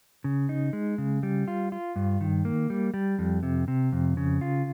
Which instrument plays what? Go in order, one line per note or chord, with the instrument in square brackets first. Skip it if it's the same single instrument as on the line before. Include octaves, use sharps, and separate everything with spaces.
[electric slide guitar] C#3
D#4
G#3
C#3
G3
F4
F4
G2
D#3
A#3
G3
G3
F2
C3
C3
F2
C#3
F4